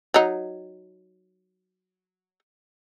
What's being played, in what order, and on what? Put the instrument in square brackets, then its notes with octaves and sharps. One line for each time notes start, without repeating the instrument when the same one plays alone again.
[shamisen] F#3 D#4